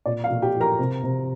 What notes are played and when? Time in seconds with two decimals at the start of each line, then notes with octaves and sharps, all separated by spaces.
0.06 A#2 D5
0.24 F5
0.30 A#2
0.42 G4 G5
0.55 F3
0.60 A#4 A#5
0.79 C3
1.03 C3